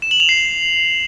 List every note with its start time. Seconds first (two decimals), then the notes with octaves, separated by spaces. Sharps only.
0.02 E7
0.11 F#7
0.20 F7
0.29 C7